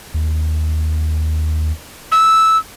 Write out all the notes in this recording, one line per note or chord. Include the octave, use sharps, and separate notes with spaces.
D#2
E6